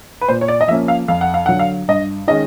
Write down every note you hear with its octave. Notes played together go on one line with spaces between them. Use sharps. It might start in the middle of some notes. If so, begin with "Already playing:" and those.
B4
A#2 C5
C#5
D5
D#5
F3 A#3 C#4 E5
F5
F2 F5
F#5
F5
D3 F#3 F#5
F5
G2 D#5
D#3 G#3 C#4 D#5